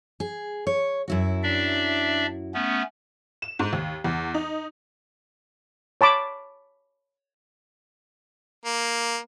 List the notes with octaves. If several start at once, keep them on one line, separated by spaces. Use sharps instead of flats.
G#4
C#5
F#2 E4 F#4
D4 D5 E5
A3 B3 C#4
E7
G#2
D#2
E2
D#4
C#5 A5 B5 D6
A#3